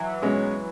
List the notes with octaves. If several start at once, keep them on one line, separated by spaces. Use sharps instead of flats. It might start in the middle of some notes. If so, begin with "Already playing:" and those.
Already playing: E3 F#3
B2 G#3 C#4